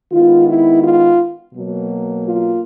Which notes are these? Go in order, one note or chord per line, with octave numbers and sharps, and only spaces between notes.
D#3 G#3 B3 F4
E4
F4
B2 F#3 A#3
F4